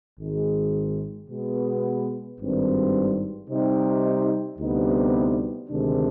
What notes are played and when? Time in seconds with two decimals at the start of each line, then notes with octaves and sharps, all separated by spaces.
0.19 G#1 G#2 D#3 G#3
1.29 B2 G#3 B3
2.39 G#1 G2 D#3 G3 C4
3.49 C3 G3 C4 D#4
4.58 D2 C3 G3 B3 D#4
5.69 D2 C3 D#3 G#3 D4